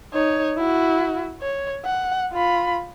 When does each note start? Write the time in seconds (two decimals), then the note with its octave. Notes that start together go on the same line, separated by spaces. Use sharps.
0.13 D#4 C#5
0.57 E4 F#4
1.41 C#5
1.85 F#5
2.33 F4 B5